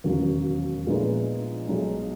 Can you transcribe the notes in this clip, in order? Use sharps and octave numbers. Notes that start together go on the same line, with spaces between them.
E1 D#2 C#3 F#3
A#1 A#2 G#3 B3 D#4
B1 B2 G#3 D#4